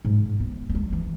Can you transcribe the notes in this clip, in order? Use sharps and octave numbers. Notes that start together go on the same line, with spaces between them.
G#2
B3
B3
G#3
F#3
E3